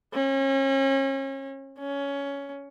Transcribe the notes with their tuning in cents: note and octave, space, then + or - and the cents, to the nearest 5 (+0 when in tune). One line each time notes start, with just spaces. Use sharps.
C#4 -35
C#4 +15